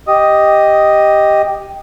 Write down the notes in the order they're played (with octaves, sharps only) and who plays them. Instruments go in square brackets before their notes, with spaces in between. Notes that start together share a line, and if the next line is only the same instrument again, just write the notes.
[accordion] G4 D#5 D#6